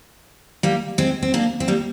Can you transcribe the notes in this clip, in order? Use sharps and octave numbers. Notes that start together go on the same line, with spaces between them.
G3 A#3
G#3 C4
C4
A#3 D4
C4
G3 A#3